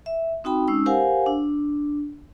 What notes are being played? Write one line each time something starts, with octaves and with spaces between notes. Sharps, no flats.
E5
C4 D#4 F#4 G5 B5
G#3 C#4 D#4 E6
G4 A#4 C5 F5 F#5 G#5
D4